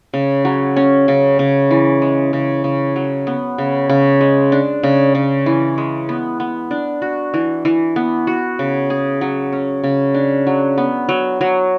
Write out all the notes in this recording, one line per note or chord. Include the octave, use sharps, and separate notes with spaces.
C#3
F#3
C#4
C#3
C#3
E3
G#3
C#3
C#3
F#3
B3
C#3
C#3
G#3
D4
C#3
C#3
E3
G#3
B3
B3
D4
F#4
E3
E3
B3
F#4
C#3
G#4
F#3
C#4
C#3
D4
F#3
B3
F#3
F#3